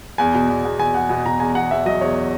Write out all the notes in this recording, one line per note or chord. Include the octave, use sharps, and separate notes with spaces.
E2 G#5
B2
E2
E2
E2 G#5
E2 F#5
B2 G#5
B2 A#5
E2 G#5
E2 F#5
E2 E5
F#3 D#5
E2 C#5